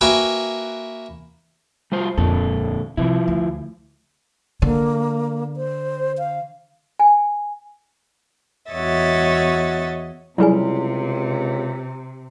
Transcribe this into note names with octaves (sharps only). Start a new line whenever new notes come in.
A#3 F#4 B4 E5 G5 G#5
G3 F4 C5
D#1 F2 A#2 D3 A4
C3 F3 E4
D2
D3 A#3
C5
F5
G#5
E2 F#4 C#5 D#5 E5 A6
C#2 C3 F#3 G3 E4 G#4 B4 G#5